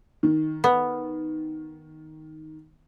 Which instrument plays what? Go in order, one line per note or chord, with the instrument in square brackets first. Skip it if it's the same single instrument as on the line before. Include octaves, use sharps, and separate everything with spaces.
[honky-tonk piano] D#3
[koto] B3